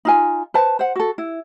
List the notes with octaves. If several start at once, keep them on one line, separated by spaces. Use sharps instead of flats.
D#4 F4 G#5
B4 C5 A5
C5 F#5
F#4 A4
E4